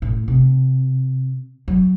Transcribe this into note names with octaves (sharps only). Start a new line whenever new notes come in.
A2
C3
F#3